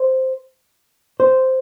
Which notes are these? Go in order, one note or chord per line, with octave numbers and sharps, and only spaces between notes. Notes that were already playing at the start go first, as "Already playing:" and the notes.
Already playing: C5
C5